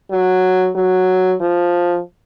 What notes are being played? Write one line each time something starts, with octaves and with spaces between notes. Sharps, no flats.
F#3
F#3
F3